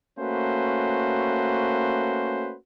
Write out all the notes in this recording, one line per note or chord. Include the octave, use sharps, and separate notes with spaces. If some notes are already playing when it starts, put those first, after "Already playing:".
A3 A#3 C#4 F#4 B4 C5